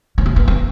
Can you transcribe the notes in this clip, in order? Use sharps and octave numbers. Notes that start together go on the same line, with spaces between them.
C#4
C4
B3
C4